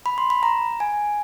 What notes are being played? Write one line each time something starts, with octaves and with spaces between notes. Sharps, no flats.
B5
C6
B5
A#5
G#5